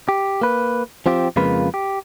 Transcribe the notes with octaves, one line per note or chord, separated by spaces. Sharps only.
G4
A#3 B4
F3 C4 F4 G4
F2 C#3 G#3 A#3 F4 B4
G4